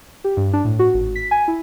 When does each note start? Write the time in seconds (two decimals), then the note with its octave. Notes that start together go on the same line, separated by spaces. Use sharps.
0.24 G4
0.37 G2
0.53 D4
0.65 A2
0.79 F#4
0.94 G#1
1.16 B6
1.31 G#5
1.48 E4